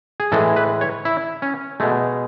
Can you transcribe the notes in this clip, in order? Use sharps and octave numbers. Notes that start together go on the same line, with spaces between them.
G#4
A2 E3 G#3 A4
B4
C#5
E4
C#4
B2 G#3 A3